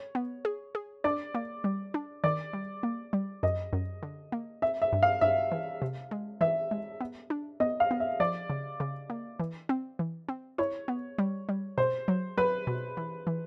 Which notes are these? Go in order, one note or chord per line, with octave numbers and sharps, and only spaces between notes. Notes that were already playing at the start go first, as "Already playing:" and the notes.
Already playing: C#5
B3
G#4
G#4
D4 D5
A#3
G3
D4
D#3 D5
G3
A#3
G3
F#2 D#5
F#2
D3
A#3
C4 E5
E5
G2
F5
G2 E5
E3
C3
G#3
E3 E5
G#3
B3
D4
B3 D#5
F5
B3
E5
F3 D5
C#3
C#3
A#3
E3
C4
E3
C4
E4 C#5
B3
G3
G3
B2 C5
F#3
F#3 B4
B2
E3
E3